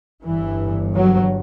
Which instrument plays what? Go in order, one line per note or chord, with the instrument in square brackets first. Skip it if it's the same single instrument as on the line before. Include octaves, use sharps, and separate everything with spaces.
[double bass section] G1 G2 E3
F#3